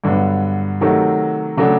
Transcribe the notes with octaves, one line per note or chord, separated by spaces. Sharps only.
G2 D3 F#3 B3
C3 D#3 F#3 A3
C#3 F#3 A3 D4